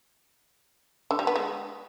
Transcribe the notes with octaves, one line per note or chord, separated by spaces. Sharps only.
D3
G3
B3
G#3